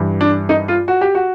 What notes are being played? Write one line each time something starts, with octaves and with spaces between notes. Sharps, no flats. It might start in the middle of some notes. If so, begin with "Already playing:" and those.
Already playing: G2 E3
D4
D#4
F4
F#4
G4
F#4